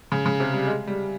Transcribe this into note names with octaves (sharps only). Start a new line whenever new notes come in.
C#3
C#3
C3
G3
G#3
G3